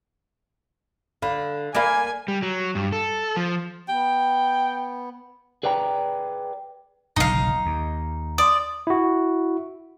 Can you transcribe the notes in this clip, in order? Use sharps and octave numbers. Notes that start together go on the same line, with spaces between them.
D3 F5 B5
A#3 D5 F5 G#5 B5 D7
G3
F#3
G2
A4
F3
B3 G5
G#4 B4 D5 G5 A#5
F#1 B1 D3 D#4 F5
D#2
D5 C6 D#6
E4 F#4